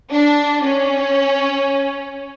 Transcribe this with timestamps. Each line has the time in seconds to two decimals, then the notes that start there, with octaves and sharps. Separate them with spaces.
0.12 D4
0.63 C#4